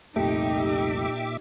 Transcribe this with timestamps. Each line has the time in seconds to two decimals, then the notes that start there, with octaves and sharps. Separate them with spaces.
0.16 C2 F2 A#2 A3 D#4 G4 E5 D6